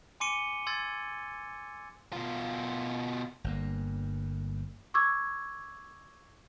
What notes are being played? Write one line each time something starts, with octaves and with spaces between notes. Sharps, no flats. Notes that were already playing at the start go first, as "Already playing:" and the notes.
G#5 C6 D6 C#7 D#7 G7
C6 E6 G#6 A6
B2 F4
G1 G2 A#3
C#6 D6 E6 G#6